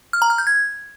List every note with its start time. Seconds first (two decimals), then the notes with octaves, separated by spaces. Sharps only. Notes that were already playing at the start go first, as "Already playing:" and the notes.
0.13 F6
0.22 A#5
0.30 F6
0.38 G6
0.47 G#6